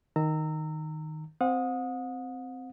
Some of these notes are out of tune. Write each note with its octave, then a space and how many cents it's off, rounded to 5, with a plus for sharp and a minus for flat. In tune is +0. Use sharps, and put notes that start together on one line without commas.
D#3 +0 A#5 -25 E6 -5
C4 -10 F#5 -40 D#6 +0